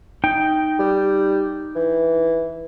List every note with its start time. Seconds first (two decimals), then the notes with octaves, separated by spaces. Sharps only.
0.24 D#4 G5
0.79 G3
1.76 E3